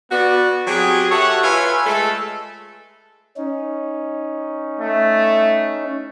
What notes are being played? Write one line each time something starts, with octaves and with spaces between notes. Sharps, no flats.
B3 F#4 D5
F#3 C4 G4 G#4
F#4 G4 A4 C#5 E5 F#5
F4 B4 C#5 E5 G#5
G#3 A3 A4
C#4 D#4
A3